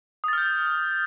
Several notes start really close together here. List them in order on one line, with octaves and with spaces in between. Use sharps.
D#6 A6 F6 G6